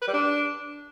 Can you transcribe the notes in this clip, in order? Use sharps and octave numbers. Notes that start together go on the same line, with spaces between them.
B4
G3
D4